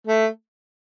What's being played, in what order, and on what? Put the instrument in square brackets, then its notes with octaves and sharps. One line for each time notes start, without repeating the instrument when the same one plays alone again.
[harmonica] A3